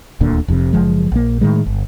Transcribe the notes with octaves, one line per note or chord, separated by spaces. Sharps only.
D#1 D2 A#2 D3
F1 F2 A2 C3
F#1 F3 G#3
A#1 A#3
A2 D#3 G#3
G1